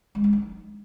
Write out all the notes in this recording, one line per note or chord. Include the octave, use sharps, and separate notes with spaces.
G#3
D4
D#4